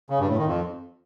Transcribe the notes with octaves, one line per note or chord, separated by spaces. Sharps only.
C#3
G2
A2
D#3
F2